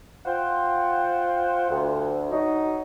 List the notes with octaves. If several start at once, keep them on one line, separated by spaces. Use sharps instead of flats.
F4 C5 F#5 G5
D2
F#3 D#4